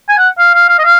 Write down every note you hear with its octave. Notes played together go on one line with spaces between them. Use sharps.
G#5
F#5
F5
F5
F5
D#5
F5